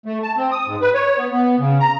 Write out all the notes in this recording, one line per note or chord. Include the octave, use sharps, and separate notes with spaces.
A3
A5
C4
D#6
G#2
B4
C#5
B3
B3
C#3
A#5